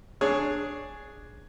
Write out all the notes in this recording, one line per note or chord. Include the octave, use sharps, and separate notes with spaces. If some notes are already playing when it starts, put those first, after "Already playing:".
D4 G#4 C#5